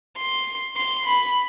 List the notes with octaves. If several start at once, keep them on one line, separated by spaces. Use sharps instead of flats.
C6
C6
B5